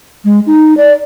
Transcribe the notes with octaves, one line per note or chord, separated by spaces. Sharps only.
G#3
D#4
D5